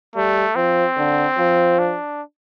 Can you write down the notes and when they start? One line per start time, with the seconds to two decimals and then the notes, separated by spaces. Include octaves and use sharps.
0.15 G3 A3
0.56 F3 C4
0.97 D3
1.38 F3
1.79 D4